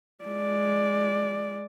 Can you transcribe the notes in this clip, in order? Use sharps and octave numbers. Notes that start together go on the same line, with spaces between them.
G#3 D5